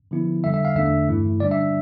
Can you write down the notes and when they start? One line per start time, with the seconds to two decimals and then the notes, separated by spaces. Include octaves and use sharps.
0.11 D3 F3 B3 E4
0.44 F2 D3 G3 E5
0.54 E5
0.65 F5
0.75 E2 D3 A3 D4 E5
1.08 G2 E3 A3 E4
1.40 D3 G3 D4 D5
1.51 E5